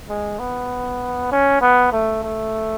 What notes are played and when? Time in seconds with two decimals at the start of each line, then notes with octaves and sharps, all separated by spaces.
0.09 G#3
0.39 B3
1.32 C#4
1.61 B3
1.92 A3
2.23 A3